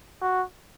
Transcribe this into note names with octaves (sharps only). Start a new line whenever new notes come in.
F#4